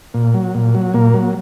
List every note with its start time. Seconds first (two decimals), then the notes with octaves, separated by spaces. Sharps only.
0.14 A#2
0.34 F#3
0.54 A#2
0.75 F#3
0.94 A#2 A#3
1.14 F#3